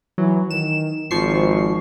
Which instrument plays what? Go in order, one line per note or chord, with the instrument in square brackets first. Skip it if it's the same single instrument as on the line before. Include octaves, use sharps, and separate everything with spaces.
[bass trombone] E3 [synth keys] F#3
[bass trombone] D#3 [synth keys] E7
[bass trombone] G#1 [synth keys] F3 C#6 C7